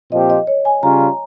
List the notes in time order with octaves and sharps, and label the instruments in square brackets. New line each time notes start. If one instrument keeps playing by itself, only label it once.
[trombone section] A#2 F3 C4 G4 [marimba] D#5
[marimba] D#5
C#5
G#5
[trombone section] C#3 G3 C#4 F4 [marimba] A#5
[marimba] A#5